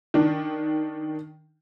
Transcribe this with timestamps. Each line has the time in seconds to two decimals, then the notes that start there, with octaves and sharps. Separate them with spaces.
0.14 D#3 D4